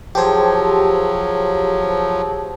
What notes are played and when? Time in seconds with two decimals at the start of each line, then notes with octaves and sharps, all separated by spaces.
0.15 F3 F#3 G4 G#4 C5 A5